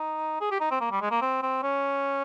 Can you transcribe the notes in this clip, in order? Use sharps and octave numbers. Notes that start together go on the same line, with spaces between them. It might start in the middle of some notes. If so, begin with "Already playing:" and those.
Already playing: D#4
G#4
G4
D#4
C4
A#3
G3
G#3
A#3
C4
C4
C#4